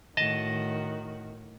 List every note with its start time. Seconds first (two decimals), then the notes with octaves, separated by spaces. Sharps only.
0.17 A2 D#3 F#4 D#5 A5